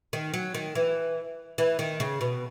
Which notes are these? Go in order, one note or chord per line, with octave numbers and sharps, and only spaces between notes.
D#3
F#3
D#3
E3
E3
D#3
C#3
B2